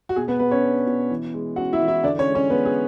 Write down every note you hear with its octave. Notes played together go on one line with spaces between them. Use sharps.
F#4
B2 G#4
B3 B4
B2 B3 B4
C#4 C#5
D4
B2
E3
G#3
C#4 F#4 F#5
E4 E5
E3
E4 E5
D3 D4 D5
C#4 C#5
G#3
C#4 C#5
G#3 B3 B4
G#4